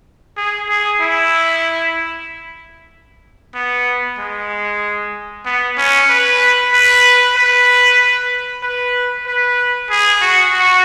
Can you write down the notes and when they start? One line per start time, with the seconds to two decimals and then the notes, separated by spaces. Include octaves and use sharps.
0.37 G#4
0.69 G#4
1.01 E4
3.54 B3
4.18 G#3
5.46 B3
5.77 C#4
6.09 B4
6.72 B4
7.36 B4
8.63 B4
9.26 B4
9.90 G#4
10.21 F#4
10.54 F#4